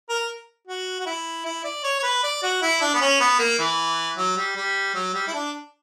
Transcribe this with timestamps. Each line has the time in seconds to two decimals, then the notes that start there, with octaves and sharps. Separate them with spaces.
0.09 A#4
0.67 F#4
1.00 F#4
1.06 E4
1.45 E4
1.64 D5
1.84 C#5
1.99 C#5
2.03 B4
2.23 D5
2.43 F#4
2.62 E4
2.81 D4
2.94 B3
3.01 C#4
3.20 B3
3.39 A#3
3.59 E3
4.17 F#3
4.36 G3
4.56 G3
4.95 F#3
5.14 G3
5.27 E4
5.33 D4